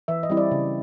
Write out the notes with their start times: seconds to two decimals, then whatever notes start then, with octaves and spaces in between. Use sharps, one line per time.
0.08 E3 E5
0.23 D#5
0.30 G3 C4 E4
0.37 D5
0.51 C#3